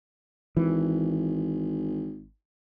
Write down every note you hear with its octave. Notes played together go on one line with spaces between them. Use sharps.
G#1 E3